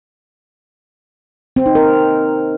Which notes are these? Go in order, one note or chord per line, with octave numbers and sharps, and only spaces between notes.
C4
D#4
A#4